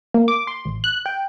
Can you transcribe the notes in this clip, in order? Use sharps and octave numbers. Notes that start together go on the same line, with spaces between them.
A#3
D6
C6
A1
F#6
G5